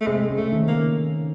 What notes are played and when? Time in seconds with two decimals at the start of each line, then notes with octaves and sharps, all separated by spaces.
0.01 A3
0.07 C3 G#3 C4
0.30 C#3 C#4
0.37 A3
0.52 D#3 D#4
0.68 A#3
0.75 C#3 C#4